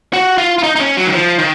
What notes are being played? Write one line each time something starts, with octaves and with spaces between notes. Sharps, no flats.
F#4
F4
F4
D#4
D#4
C#4
F#3
D#3
F3
D#3